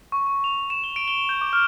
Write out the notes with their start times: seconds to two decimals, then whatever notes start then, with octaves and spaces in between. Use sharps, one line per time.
0.12 C#6
0.27 C#6
0.44 F7
0.70 E7
0.84 G7
0.96 D7
1.08 G7
1.29 G6
1.41 D6
1.53 F6